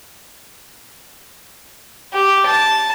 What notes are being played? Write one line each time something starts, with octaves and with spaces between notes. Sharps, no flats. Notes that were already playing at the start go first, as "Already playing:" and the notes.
G4
A5